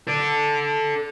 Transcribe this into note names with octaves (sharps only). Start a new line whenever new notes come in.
A4 D5